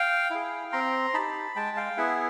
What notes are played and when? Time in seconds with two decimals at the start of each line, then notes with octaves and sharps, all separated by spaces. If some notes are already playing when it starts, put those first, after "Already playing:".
Already playing: F5 G5
0.31 E4 G#4
0.72 C4 A#5 C6
1.14 D#4 G4 A5 B5
1.56 G#3 G5 A5
1.77 F5 G5
1.97 B3 E4 G#4 E5 F#5